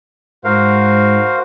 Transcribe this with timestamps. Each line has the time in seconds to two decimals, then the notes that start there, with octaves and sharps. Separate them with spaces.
0.44 G#2 F#4 A#4 C5 F5